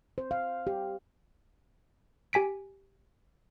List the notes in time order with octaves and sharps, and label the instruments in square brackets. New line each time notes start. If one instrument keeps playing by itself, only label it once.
[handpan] C5
F5
G4
[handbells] G4 G#5 B6 D7